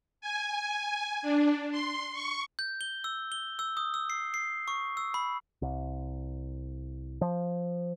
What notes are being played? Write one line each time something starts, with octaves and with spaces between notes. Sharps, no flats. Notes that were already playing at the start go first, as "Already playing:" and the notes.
G#5
D4
C6
C#6
G6
G7
E6
G7
E6
D#6
E6
C7
C7
C#6
E6
B5
C2
F3